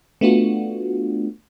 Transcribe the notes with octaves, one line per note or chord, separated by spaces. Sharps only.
A3 B3 D4 F4 F#4